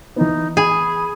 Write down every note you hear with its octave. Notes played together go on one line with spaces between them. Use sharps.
E3 B3 D#4
G#4 B5